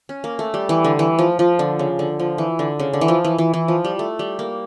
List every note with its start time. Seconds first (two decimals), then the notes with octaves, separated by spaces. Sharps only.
0.09 C#4
0.24 A#3
0.39 A3
0.54 G3
0.69 E3
0.85 D3
0.99 E3
1.19 F3
1.39 F3
1.59 D3
1.79 C#3
1.99 D3
2.20 F3
2.38 E3
2.59 D3
2.80 C#3
2.93 D3
3.01 E3
3.08 F3
3.25 E3
3.38 E3
3.54 E3
3.68 F3
3.84 G3
3.99 A3
4.19 G3
4.39 A#3